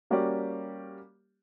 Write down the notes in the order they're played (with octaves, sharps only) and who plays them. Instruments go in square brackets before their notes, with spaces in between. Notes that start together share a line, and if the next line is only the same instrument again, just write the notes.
[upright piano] G3 A#3 C#4 F#4 G4 D5